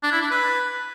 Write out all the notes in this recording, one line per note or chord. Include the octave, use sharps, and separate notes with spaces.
D4
E4
D4
B4